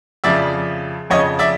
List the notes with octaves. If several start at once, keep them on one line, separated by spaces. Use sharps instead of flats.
F2 C#3 F3 D5 E5
F2 C#3 F3 C#5 D#5
D5 E5